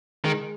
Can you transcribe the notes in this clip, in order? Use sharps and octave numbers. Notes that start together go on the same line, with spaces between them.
D#3 G#3